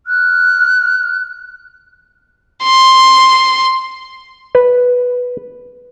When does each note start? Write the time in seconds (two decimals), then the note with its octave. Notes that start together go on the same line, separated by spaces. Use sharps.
0.07 F6 F#6
2.63 C6
4.55 B4